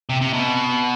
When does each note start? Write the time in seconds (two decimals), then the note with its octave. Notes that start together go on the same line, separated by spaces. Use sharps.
0.10 C3
0.21 C3
0.34 B2